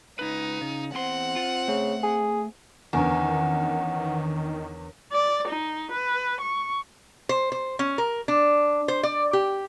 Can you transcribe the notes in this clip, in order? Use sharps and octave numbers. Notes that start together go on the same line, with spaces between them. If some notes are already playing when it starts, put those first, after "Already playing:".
C#2 D#4 B4
C#3
E2 C4 F#5 C6
F4
C#3 A3
G#4
E2 D3 D#3 B3 C#4 A#4 F#5
D5
D#4
B4
C#6
C5
C5
C#4
A#4
D4
C5
D5
G4